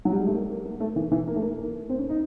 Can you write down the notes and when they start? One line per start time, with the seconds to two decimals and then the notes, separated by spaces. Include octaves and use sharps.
0.05 F#3
0.12 G3
0.20 G#3
0.26 A3
0.34 A#3
0.50 A#3
0.65 A#3
0.80 A3
0.96 E3
1.11 E3
1.27 A#3
1.36 A3
1.42 A#3
1.58 A#3
1.89 C4
1.99 C#4
2.09 D#4